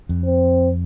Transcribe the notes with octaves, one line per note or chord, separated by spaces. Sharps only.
F2
C4